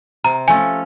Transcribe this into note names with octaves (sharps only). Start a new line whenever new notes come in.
C3 A#5
F3 A3 C#4 G#5